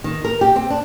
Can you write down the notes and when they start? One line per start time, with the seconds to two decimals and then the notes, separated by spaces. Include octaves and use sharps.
0.04 D#3
0.25 A#4
0.41 G4
0.56 C4
0.70 D4